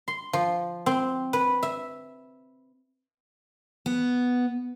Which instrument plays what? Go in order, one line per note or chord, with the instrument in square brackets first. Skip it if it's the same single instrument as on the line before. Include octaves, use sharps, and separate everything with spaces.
[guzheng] C6
F3
C4
B4
E5
[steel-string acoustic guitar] B3